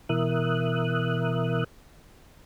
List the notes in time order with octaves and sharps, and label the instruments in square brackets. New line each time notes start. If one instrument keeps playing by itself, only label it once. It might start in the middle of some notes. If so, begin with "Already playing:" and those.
[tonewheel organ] B2 E3 A#4 E5 D#6 F#6